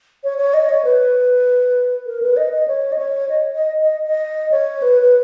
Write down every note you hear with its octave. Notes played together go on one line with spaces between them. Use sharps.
C#5
C#5
D#5
C#5
B4
A#4
B4
D#5
D#5
C#5
D#5
C#5
D#5
D#5
D#5
D#5
C#5
B4
B4